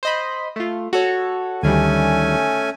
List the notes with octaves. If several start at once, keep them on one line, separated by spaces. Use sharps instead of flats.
C5 D#5 B5
A3 F4
F#4 A4 C#5
D2 D#3 G3 A3 C#4 G#5